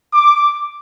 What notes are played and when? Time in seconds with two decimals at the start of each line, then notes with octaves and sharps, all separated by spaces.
0.13 D6